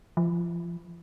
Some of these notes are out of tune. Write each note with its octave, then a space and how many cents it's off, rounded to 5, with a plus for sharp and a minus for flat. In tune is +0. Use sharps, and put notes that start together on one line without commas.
F3 -30